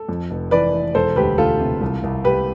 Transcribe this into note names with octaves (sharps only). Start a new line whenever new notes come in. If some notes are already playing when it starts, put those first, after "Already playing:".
Already playing: A4
F2
F1
E3 B4 D5
E3
E1 A4 C5
D2 G4 B4
D2 F4 A4
C3
C2
C2
C2 G4 B4